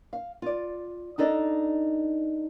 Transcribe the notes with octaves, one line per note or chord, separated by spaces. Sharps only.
F5
F4 D5
D4 D#4 A4 D5 D#5